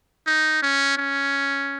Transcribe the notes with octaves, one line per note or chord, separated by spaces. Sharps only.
D#4
C#4
C#4